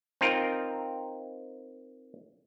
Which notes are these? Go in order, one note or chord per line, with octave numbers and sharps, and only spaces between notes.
C4 D#4 F4 A#4